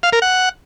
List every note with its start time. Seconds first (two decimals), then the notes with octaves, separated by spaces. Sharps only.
0.03 F5
0.13 A#4
0.22 F#5